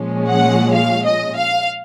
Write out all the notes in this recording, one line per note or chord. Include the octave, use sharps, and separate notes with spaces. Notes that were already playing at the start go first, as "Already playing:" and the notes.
Already playing: A#2 F3 G#3 C#4
F#5
F5
D#5
F5